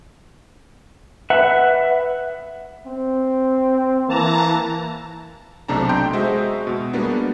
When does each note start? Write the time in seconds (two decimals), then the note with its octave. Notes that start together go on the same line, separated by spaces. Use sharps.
1.30 B4 E5 F#5
2.86 C4
4.08 E3 A#3 A5 A#5
5.68 B1 C3 A3 D4 A5 A#5
5.89 G5 A#5 C6 G6
6.13 G#3 F#4 C5 D#5 E5
6.67 B2
6.93 G3 G#3 A#3 B3 D4 F#4